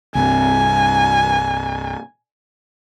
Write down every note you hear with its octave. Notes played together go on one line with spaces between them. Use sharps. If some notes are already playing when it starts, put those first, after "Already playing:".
C2 G2 C4 G#5